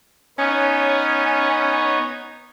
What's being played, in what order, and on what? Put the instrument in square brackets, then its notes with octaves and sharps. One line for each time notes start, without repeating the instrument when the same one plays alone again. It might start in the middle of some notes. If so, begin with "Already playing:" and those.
[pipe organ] B3 D#4 C#5 [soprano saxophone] C#4